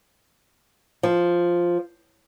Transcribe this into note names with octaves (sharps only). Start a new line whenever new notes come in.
F3